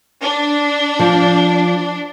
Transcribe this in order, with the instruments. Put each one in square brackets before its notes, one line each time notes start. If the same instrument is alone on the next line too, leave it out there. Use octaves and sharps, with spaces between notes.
[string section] D4
[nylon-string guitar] F3